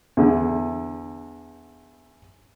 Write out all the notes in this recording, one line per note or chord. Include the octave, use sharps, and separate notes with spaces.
E2 D3